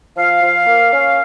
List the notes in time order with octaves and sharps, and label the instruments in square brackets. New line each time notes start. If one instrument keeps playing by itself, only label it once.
[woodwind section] F3 F5
F3
A#3
C#4